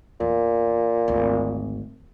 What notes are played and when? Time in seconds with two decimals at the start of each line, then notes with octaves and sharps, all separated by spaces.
0.20 E2 A#2
1.08 G#1 D2